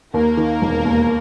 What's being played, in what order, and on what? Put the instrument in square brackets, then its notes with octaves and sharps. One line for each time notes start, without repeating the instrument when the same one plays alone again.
[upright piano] D#2 [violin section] A#3 A#4
[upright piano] D#3
E1
D#2